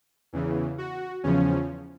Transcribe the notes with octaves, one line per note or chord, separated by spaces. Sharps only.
E2 C#3 E3
F#4
E2 C#3 F3 C#4